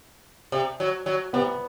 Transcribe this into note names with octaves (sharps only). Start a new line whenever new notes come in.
C3
F#3
F#3
C3 B3